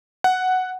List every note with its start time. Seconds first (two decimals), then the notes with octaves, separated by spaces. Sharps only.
0.24 F#5